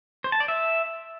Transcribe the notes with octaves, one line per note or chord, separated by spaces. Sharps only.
C5
A5
D5
E5